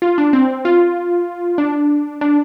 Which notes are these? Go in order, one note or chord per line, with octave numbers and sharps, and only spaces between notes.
F4
D4
C4
F4
D4
D4